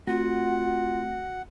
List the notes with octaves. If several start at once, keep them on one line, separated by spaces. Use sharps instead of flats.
A3 C4 F4 F#4 F#5